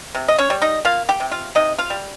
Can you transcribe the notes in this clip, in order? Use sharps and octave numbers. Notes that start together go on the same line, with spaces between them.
C3
D#5
C#4 C#5
G3
D#4 D#5
A#3 F4 F5
G4 G5
C3
F4 F5
C3 D#4 D#5
F4 F5
G3